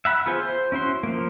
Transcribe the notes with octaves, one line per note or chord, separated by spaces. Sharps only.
E5 F#5 B5
B3 F4 G#4 C5
C5
C#4 E4 F#4 C6
F3 A#3